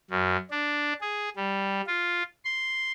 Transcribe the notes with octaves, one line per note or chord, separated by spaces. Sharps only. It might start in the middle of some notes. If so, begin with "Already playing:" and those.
F#2
D4
G#4
G3
F4
C6